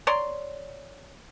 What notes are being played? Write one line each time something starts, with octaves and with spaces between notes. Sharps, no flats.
C#5 D5 A#5 C6